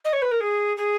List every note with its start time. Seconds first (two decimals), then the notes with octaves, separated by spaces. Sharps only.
0.04 D#5
0.12 C#5
0.21 B4
0.31 A#4
0.40 G#4
0.76 G#4